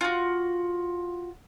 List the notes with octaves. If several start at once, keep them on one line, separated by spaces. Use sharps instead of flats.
F4 F#4